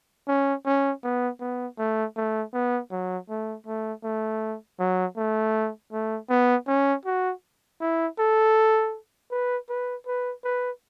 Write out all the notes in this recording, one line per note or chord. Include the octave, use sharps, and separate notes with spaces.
C#4
C#4
B3
B3
A3
A3
B3
F#3
A3
A3
A3
F#3
A3
A3
B3
C#4
F#4
E4
A4
B4
B4
B4
B4